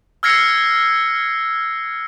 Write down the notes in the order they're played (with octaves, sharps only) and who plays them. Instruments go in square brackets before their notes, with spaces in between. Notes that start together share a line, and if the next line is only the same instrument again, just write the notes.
[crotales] E6 F6 G#6 A#6 C7 C#7